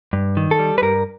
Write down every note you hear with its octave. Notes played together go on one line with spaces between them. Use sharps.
G2
D#3
A4
G3
B4
G2 A#4